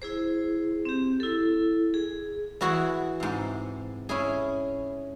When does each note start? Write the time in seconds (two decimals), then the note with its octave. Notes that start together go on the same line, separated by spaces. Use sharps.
0.02 E4 G#4 C5
0.85 C4 G4
1.20 E4 A4
1.94 G#4
2.61 E3 E4 F#4 G#4 F#5
3.20 G#2 C3
4.09 C#4 E4 G#4